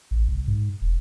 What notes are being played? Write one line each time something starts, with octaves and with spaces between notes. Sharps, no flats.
A1
C2
G#2
E1